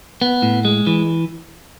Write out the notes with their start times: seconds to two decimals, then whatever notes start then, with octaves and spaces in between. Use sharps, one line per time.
0.21 B3
0.42 A2
0.65 G#3
0.87 E3